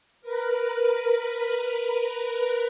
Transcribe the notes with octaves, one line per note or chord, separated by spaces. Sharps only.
A#4 B4